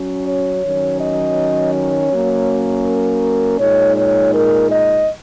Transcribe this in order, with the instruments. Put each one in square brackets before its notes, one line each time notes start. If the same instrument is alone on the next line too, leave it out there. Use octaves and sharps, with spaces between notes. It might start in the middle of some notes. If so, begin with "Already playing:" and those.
Already playing: [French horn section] F#3 C#4
C#5
D#3 F#3 C#4
D#5
C#5
F#3 A#3 C#4
A#4
A#2 G#3 D#4 C#5
C#5
A#4
D#5